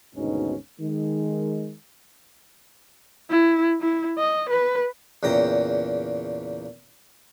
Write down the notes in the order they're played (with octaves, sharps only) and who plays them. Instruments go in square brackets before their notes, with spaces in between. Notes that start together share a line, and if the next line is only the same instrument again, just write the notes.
[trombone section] G#1 D2 G#2 B2 C#4 D#4
D#3 G#3
[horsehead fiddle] E4
E4
D#5
B4
[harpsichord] E2 A#2 C#3 G5 A#5